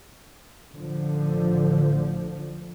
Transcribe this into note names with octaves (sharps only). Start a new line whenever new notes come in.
A1 D3 F3